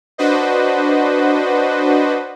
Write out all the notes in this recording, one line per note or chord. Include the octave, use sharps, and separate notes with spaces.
D4 F#4 B4 C5 D#5